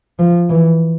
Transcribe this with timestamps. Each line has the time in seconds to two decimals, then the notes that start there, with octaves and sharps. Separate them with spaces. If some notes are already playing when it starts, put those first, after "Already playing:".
0.19 F3
0.50 E3